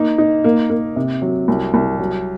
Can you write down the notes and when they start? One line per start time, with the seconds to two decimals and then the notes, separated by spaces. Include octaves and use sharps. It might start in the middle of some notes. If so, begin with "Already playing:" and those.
Already playing: A#3 D#4
0.18 D#4
0.44 A#3
0.70 A#3
0.96 C3
1.22 F#3
1.48 C2
1.74 C2
1.99 F#3